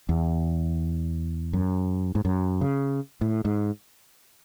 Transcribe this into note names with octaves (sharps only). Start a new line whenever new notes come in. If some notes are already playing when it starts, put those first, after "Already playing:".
E2
F#2
G#2
F#2
C#3
A2
G#2